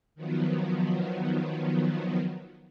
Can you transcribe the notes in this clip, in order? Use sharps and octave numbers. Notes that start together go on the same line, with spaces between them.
D#3 F3 F#3 B3